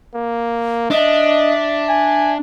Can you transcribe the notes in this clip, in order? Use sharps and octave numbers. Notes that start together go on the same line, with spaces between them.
A#3
D4 D#5 E5
G#5